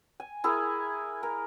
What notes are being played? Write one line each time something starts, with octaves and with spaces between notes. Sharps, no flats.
G#5
E4 G#4 A#4
A#4